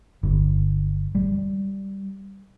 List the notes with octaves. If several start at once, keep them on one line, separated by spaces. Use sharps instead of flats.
G1
G3